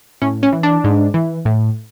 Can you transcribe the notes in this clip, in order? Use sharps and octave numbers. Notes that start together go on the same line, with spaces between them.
A2 C#4
C#4
E3
D4
G#2
E3
A2